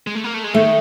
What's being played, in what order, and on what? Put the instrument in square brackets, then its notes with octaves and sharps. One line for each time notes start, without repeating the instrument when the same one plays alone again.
[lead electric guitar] G#3
A3
A#3
A3
G#3
[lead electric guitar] D#3 [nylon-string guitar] A3